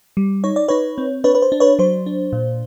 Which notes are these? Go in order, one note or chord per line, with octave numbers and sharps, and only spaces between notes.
G3
D#4 C#5
D5
D#4 B4 C#5
C4
D4 B4 C#5
B4
C5
D4
B4 C#5
F#3 C5
D4
A#2